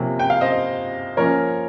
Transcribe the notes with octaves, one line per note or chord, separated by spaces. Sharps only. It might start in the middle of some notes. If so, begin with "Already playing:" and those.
Already playing: C3 F3 A#3 C#4
G5
F5
C5 D#5
F3 A#3 C#4 A#4 C#5